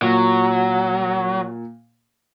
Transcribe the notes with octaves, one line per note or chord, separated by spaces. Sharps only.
A#2 F#3